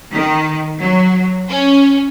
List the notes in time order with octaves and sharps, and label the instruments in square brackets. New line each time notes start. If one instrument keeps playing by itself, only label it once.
[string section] D#3
F#3
C#4